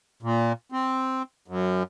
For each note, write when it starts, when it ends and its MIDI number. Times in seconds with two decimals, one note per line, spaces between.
0.23 0.53 46
0.72 1.22 60
1.48 1.83 42